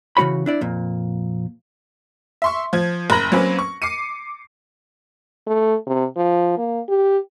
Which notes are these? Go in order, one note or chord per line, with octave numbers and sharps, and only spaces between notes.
C#3 E3 A#3 F#4 C#5 B5
D4 E4 D5
F2 A#2
E5 C6 C#6
F3 G#6
F#1 A#5 B5 A#6 F#7
F#3 A#3 C4 C#4 B4
C#6
D6 C7 C#7 D#7
A3
C3
F3
A#3
G4